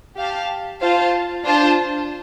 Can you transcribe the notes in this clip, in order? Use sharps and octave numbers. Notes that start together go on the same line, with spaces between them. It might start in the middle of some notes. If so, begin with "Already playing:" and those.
G4 F5 A5
F4 C5 F5 A5
D4 F4 C5 A5